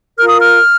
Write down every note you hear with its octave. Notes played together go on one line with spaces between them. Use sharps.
F4 A#4 F6
D#6
F6